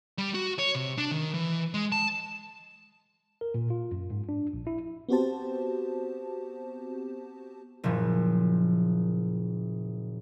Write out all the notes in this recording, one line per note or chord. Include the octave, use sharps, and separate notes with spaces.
G3
F#4
C#5
C3
D4
D#3
E3
G#3
A5
A#4
A#2
F4
F#2
G#2
D4
A#1
E4
B3 C4 F#4 G4 C5 A5
F#1 A#2 F3